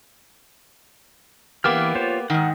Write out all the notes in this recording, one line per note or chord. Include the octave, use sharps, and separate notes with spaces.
E3 A#3 B3 G4 D6 F6
F4 C5 C#5
G#2 D#3 F#5